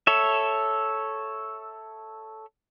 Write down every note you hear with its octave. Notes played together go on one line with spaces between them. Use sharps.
A4 C#5 E5